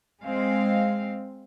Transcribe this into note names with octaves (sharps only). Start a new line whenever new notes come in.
G#3 C4 F5